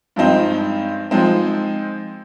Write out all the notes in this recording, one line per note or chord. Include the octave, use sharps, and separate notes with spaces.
G2 F3 G#3 C4 D#4
F3 G#3 C4 D#4